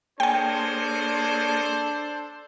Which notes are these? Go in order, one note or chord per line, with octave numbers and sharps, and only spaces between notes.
A#3 D4 G#4 A4 C5 C#5 G5 G#5